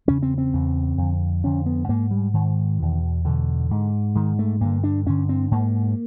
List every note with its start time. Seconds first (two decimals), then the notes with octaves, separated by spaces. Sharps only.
0.07 E2 C#3 C#4
0.23 C4
0.38 C4
0.53 E2 C#3
0.98 F2 D3
1.44 F2 D3 C#4
1.66 B3
1.88 G#2 A#3
2.11 G3
2.34 G#2 D#3
2.79 E2 B2
3.24 E2 B2 D3
3.71 G#2
4.15 G#2 D#3
4.39 A3
4.61 G2 D3 A#3
4.84 D4
5.06 G2 D3 C#4
5.29 C4
5.51 G#2 A#3